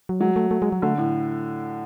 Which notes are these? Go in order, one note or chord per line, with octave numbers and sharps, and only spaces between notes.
F#3
F#3 G#3
A3
A3
G#3
F#3
D3 A3
A2